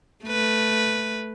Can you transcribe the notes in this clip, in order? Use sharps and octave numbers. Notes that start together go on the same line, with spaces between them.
A3 B4